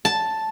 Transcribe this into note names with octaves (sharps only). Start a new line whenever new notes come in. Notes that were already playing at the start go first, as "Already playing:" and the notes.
A5